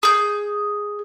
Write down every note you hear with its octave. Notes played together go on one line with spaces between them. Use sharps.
G#4 G6